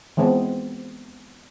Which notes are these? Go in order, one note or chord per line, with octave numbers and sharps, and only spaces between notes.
E3 G#3 B3 C4